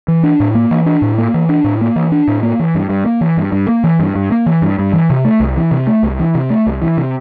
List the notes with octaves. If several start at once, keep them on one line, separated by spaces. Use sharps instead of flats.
E3
D4
A2
A#3
E3
D4
A2
A#3
E3
D4
A2
A#3
E3
D4
A2
A#3
E3
G2
G2
A#3
E3
G2
G2
A#3
E3
G2
G2
A#3
E3
G2
G2
E3
C3
A3
C2
E3
C3
A3
C2
E3
C3
A3
C2
E3
C3